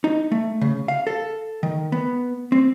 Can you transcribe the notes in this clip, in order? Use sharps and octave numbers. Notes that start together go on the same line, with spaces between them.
D#4
A3
C#3
F5
A4
D#3
B3
C4